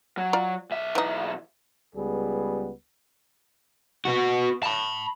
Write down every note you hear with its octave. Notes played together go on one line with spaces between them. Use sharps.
F#3
F4 D5 A#5
B1 E5
E3 D#4
C#2 G3 B3 G#4
B3 F#4
A5 B5